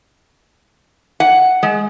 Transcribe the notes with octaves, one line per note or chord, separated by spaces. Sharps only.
F#5
G#3